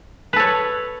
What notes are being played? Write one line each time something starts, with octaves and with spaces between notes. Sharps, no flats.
A4 B4 C#5